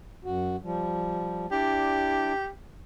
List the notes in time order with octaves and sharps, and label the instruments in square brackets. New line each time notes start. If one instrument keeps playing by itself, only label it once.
[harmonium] F#2 F#4
F3 G3
[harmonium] D4 E4 D5 [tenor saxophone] G4